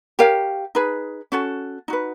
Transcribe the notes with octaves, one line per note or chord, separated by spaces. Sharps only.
G4 A#4 C#5 F5
D#4 G#4 B4
C#4 F#4 A4
D#4 F#4 B4